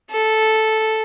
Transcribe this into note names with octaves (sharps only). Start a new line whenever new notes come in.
A4